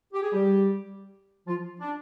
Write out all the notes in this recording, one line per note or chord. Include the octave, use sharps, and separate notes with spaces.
G4
G#4
G3 G4
F3 F4
D4